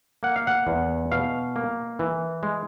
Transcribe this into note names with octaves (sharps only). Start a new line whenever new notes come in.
A#3 F#5
F5
F#5
E2
B2 F5
A#3
E3
G#3